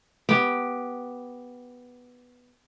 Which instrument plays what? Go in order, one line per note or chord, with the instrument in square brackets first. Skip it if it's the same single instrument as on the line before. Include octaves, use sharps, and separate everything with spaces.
[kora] B3 G4